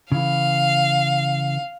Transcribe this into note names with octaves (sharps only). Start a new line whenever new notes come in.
C#3 E3 F5